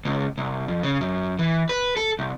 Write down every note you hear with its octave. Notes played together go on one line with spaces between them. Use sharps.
C#2
C2
F2
C#3
F#2
E3
B4
A4
C2